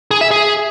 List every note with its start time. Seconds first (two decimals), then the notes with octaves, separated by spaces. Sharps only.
0.11 G#4
0.21 E5
0.31 G#4